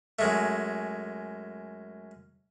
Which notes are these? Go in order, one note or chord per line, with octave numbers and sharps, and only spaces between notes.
F#2 G#3 A3